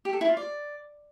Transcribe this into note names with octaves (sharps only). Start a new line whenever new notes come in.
G4
A4
E4
F4
D5